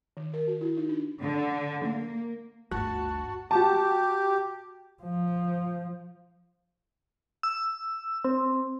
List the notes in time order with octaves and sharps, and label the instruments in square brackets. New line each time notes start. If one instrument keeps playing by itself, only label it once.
[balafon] D#3
A#4
F#4
E4
D#4
D4
[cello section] D3
A#3
[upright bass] G1 D2 [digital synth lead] F#4 [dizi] A5
[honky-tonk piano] F#4 A5 [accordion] G4
[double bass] F3
[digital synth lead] E6
C4